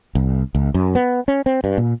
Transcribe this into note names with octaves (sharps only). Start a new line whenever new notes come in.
C2
C#2
F#2
B3
C#4
C4
G2
A#2